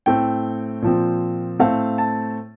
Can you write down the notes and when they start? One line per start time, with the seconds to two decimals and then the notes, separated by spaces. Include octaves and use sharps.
0.06 A2 A3 C4 G5
0.82 A#2 F3 C4
1.59 A2 A3 C4 F5
1.98 A5